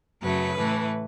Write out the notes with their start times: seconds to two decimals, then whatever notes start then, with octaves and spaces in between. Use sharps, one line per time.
0.21 F#2 C#3 F#3 A3 B4
0.58 A2 E3 A3